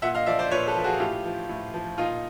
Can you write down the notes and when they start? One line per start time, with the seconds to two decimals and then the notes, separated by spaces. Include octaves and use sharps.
0.02 A#2 E5 F#5
0.15 D#5 F5
0.26 F3 D5 E5
0.39 C5 D5
0.51 A#2 B4 C#5
0.67 A4 B4
0.76 F3
0.84 F#4 G#4
1.00 A2 F4 G4
1.25 F3
1.49 A2
1.74 F3
1.98 A#2 D#4 F4